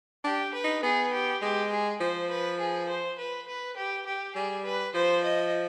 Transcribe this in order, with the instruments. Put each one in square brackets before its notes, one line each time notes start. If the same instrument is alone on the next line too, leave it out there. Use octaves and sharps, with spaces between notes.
[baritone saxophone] D4 [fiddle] G4
[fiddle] B4
[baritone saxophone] D#4
[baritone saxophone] B3 [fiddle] G#4
[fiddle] G4
[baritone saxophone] G#3 [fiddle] G4
[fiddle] G#4
[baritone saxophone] F3 [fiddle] C5
[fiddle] B4
G#4
C5
B4
B4
G4
G4
[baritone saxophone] G3 [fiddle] G#4
[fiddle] B4
[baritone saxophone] F3 [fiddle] C5
[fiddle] D#5